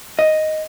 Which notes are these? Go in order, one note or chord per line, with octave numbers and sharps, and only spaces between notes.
D#5